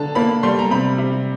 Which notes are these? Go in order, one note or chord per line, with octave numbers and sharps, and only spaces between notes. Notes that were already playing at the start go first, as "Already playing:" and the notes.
Already playing: D3 A5
A#3 B5
G3 C6
A#5
C3 B5
C3